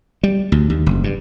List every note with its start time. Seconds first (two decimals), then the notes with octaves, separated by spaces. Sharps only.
0.23 G3
0.52 D2
0.70 D#2
0.86 F#1
1.04 G2